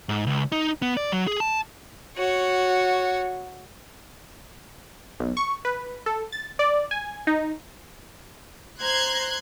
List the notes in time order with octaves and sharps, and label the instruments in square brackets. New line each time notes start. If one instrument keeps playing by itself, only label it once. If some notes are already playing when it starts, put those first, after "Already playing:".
[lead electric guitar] G#2
C#2
D#4
B3
D5
F#3
G#4
A5
[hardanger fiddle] F#4 C#5
[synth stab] B1
C#6
B4
A4
A6
D5
G#5
D#4
[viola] C5 A#5 [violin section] C6 F#6 G#6